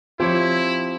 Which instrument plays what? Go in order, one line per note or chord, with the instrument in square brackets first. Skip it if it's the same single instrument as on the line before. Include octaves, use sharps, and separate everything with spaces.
[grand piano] F3 [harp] C4 G4 C#5 [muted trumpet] E4